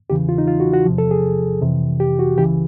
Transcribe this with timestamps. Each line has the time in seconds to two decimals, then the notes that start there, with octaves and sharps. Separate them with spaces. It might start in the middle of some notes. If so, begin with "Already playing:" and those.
0.10 E2 C#3 E3 G4
0.29 F4
0.38 D#4
0.47 F4
0.60 F#4
0.73 F#4
0.86 E2 C3 F3
0.98 A4
1.11 G#4
1.62 F2 C3 E3
2.00 G4
2.19 F#4
2.37 C#2 C#3 E3 G4